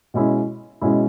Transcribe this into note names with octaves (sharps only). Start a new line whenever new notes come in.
B2 G#3 C#4 E4
B2 G#3 C#4 E4